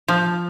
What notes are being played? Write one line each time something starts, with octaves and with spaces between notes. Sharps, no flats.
F3